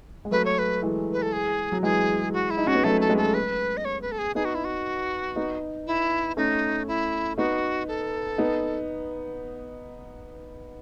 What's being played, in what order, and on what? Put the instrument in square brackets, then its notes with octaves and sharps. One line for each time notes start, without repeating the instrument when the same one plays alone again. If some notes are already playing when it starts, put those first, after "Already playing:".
[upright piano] G#3
[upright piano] F#3 A3 [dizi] B4
[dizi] C#5
B4
[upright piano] E3 G#3
[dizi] B4
A4
G#4
[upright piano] F#3
[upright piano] E3 G#3 [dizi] G#4
[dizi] F#4
E4
[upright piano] D#4
[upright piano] C#4 [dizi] F#4
[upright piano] B3
[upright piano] F#3 A3 [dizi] A4
[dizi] A4
[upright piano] G#3 B3
[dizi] A4
B4
D#5
C#5
B4
A4
G#4
[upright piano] B3 D#4 [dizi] G#4
[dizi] F#4
E4
F#4
[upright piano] B3 D#4
[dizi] E4
[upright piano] A3 C#4 [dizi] D#4
[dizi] E4
[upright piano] B3 D#4 [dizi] F#4
[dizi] A4
[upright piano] B3 D#4